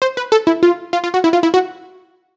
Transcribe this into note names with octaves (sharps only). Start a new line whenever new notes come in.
C5
B4
A4
E4
F4
F4
F4
F#4
E4
F4
E4
F#4